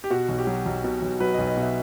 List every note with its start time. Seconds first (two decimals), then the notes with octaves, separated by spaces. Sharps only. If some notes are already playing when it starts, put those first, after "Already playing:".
0.04 G4
0.10 B2 F#4
0.29 B1
0.38 G4
0.47 F#3
0.66 B1
0.84 B2
1.02 B1
1.20 F#3 B4
1.34 D#5
1.38 B1
1.47 D#5
1.57 B2
1.62 E5